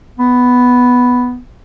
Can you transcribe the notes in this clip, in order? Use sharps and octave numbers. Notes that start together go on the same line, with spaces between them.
B3